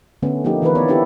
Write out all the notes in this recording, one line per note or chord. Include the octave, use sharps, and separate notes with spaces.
D3 A3 B3 C#4
F3 A3 A#3 D#4 G4
D#3 E3 A#3 E4 A#4 B4
B3 C#5 D5
C4 D4 E4 G4 A4